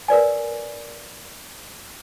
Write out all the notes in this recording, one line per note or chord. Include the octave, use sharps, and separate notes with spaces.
A#4 B4 D5 G#5